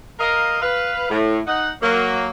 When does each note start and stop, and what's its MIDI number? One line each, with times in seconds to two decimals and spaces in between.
0.20 0.60 70
0.20 0.60 75
0.20 0.60 77
0.61 1.07 71
0.61 1.07 77
1.10 1.39 45
1.47 1.70 63
1.47 1.70 78
1.82 2.30 54
1.82 2.30 58